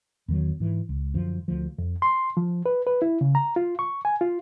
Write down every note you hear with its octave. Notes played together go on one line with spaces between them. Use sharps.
E2 D#3 F#3
G#2 E3
C#2
F#2 D3 F3
D2 F3
F2
C6
F3
B4
B4
E4
C#3
A#5
F4
C#6
G#5
F4